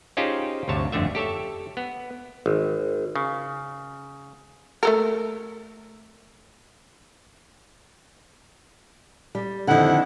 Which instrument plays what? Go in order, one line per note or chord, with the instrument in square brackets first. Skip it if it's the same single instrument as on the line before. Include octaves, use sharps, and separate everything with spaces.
[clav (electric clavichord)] C#4 D#4 F4 G4 G#4 C5
D2 G2 C3 C#5 A5
G1 F2 D3 A3 E5
G4 A4 C#5 E5
B3
G#1
C#3
[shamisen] A3 A4 A#4
[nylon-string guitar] G3
[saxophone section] F2 E4 F#5 [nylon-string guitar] D3 D#3